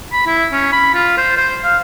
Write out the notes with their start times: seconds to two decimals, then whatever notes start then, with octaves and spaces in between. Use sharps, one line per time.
0.13 B5
0.27 E4
0.52 C#4
0.72 B5
0.94 F4
1.18 C5
1.37 C5
1.64 F5